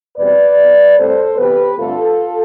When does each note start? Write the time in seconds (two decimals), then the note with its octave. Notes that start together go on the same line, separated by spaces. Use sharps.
0.16 E2 B2 G3 C4 B4 D5
0.57 B2 B3
0.97 A2 G3 C4 A4 C5
1.37 C3 E3 B3 G4 B4
1.77 G2 D3 A3 C4 F4 A4